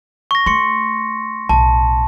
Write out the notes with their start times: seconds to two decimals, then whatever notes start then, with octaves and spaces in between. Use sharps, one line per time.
0.31 C#6 A#6
0.46 A3 C6 C#7
1.49 B1 A2 A5